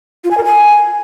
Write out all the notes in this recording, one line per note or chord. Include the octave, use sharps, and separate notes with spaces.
F4
G#5
A#4
G#5